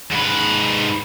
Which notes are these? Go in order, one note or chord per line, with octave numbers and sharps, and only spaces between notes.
G#2 B4